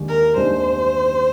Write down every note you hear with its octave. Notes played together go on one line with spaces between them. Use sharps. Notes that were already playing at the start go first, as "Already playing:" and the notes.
Already playing: D#2 D#3 G#3 D4 G4
A#4
D#2 D#3 G#3 D4 G4 C5